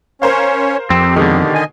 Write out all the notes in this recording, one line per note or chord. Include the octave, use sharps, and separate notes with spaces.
C#4 A#4 C5 C#5 F5
F2 C4 G4
B2 D3 D#3 G#3
D#5 G#5